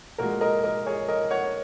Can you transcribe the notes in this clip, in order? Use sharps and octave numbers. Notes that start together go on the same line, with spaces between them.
A#2 G#3 F#4 A#4
A#4 D#5
A#4 D#5
G#4 C#5
A#4 D#5
C#5 F#5